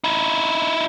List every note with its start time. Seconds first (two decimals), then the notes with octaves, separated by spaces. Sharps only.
0.04 D#4 E4